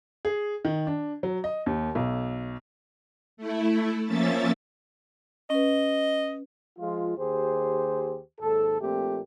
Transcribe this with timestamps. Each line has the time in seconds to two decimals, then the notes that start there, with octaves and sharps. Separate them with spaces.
0.25 G#4
0.65 D#3
0.87 D4
1.23 F#3
1.44 D#5
1.66 D#2
1.95 B1
3.37 A3 E4
4.06 F3 A#3 C#4 E5 A6
5.50 C#4 B4 D#5
6.79 F3 G#3 F4
7.18 D#2 G4 G#4 C5
8.41 D#2 G#2 A4
8.80 A#1 A#2 A3 C4 G4